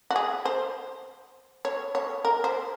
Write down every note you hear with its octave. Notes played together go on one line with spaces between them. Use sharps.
F#4
G#4
C5
C#5
C#5
A#4
C5